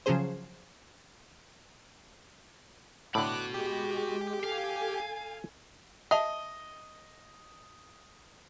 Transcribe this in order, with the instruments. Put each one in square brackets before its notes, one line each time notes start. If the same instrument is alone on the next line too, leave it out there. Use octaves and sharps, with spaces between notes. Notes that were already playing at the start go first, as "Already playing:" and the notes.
[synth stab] C#3 F3 F#3 C#4 G#4 C5
[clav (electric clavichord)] A2 D3 [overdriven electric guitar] F#4 B5 [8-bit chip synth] D6 F#6
[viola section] G#3 [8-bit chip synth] G4
[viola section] A4 G#5 [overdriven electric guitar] F5
[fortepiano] D#5 [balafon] E5 A5